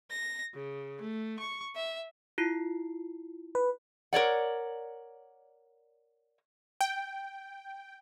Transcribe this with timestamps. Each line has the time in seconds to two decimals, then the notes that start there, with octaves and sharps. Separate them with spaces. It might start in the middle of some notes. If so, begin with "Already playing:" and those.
0.10 A#6
0.54 C#3
1.01 A3
1.40 C#6
1.75 E5
2.38 E4 F4 C7
3.55 B4
4.13 A#4 C#5 D5 F#5
6.81 G5